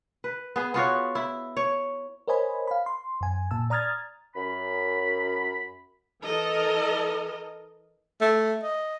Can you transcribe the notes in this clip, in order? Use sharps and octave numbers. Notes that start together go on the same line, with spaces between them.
B4
B3 G#4
B3 F4 F#4 C#5
E4
C#5
A#4 C5 C#5 D#5 G#5 B5
F5 B5
C6
F#2 G#5
A#2 A5 E6
D5 A#5 D#6 F6 G#6 A6
F#2 B5
E3 A4 A#4 D#5
A3
D#5